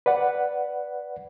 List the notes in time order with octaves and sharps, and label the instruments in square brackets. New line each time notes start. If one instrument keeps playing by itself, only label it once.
[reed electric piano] B4 D5 F#5